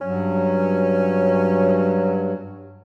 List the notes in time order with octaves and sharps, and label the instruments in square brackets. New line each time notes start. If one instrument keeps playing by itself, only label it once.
[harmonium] G2 F#3 [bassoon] C#4